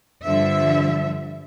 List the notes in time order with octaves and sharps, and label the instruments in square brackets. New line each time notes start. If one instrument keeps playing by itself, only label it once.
[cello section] G2 D3 F3 E5